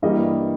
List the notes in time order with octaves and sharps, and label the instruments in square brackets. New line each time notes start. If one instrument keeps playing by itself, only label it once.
[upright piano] G2 E3 G3 A#3 D#5